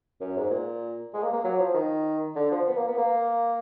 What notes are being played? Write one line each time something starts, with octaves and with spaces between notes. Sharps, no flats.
F#2
G#2
A#2
G#3
A#3
A#3
F#3
F3
D#3
D3
F3
B3
A#3
B3
A#3